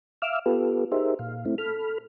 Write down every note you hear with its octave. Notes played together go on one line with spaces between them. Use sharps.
E5 F5 D6 E6 F6
B3 F4 G4 A4 B4
D#4 G4 G#4 A#4 C5 E5
A#2 F5
A3 C4 E4
A4 B5 F6